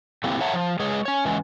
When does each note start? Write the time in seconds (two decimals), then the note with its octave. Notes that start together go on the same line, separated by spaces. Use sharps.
0.24 F#3 A3 A#3 C4 E4 G4
0.40 C#5 E5 F#5 A5 A#5
0.54 F3
0.79 G#3 G#4 B4 C#5
1.05 C#4 C#5
1.25 E3 G#3 C#4 B4